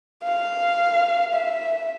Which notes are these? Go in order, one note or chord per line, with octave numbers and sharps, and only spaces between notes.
F5
E5